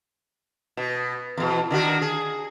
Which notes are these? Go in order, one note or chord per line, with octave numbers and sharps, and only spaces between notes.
B2
E2 B2
D3 D#3 F#4
G#4